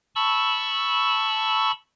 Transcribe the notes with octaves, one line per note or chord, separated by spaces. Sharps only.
A5 B5 C#6 E6